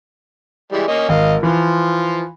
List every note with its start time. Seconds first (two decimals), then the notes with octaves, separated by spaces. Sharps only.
0.72 E3 G3 G#3
0.88 A#3 C#4 D#5
1.09 G#1 D#5 F5
1.43 E3 F3 F4